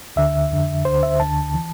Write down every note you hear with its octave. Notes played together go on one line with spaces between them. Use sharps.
D2 D3 E5
F2 D3
D2 D3 C5
E5
D2 D3 A5
E3